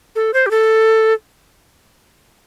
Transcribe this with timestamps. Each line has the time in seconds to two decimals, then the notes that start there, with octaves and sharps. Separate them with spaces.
0.16 A4
0.34 C5
0.46 G4
0.51 A4